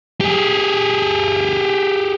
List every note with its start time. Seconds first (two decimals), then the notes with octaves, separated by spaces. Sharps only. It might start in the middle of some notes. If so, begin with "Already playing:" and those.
0.21 G4 G#4